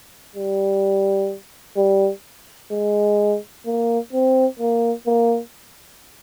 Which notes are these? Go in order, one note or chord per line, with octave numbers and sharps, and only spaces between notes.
G3
G3
G#3
A#3
C4
A#3
A#3